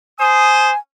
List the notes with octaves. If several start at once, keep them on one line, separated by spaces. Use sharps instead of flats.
C5 G#5 D#6